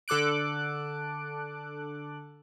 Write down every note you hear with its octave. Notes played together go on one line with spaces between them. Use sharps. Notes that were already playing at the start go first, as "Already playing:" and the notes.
D3 A4 D6 F#6 D7